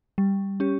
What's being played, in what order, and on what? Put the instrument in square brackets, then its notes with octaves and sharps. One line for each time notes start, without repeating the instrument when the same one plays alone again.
[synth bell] G3
C#4 G4